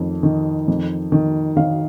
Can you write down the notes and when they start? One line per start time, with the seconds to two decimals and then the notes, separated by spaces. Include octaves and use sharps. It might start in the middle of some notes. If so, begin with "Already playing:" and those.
Already playing: F2 D#3
0.23 D#3
0.68 F2
1.12 D#3
1.56 D#3 F5